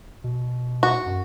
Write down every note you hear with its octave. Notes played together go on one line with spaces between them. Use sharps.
B2
F#4
F#2